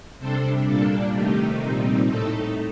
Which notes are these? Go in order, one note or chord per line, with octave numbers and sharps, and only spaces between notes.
C3 G3 D4 A4 C5
A#2 G3 A#3 D4 A4
C3 D#3 A3 D#4 G4
A#2 G3 C4 D#4
A2 A3 D#4 A4